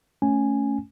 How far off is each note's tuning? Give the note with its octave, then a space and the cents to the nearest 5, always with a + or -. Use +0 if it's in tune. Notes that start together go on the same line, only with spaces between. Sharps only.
A3 +0 C#4 +0 G#5 +0